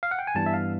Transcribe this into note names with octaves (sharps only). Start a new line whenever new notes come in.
F5
F#5
G5
G#5
G2 E3 G3 B3 A5
E5
F5